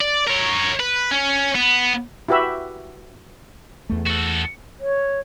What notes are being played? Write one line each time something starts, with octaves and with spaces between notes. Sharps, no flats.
D5
A#4 C#5
B4
C#4
B3
E4 F#4 G4 B4 E5 B5
E2 A3
F#4 A4
C#5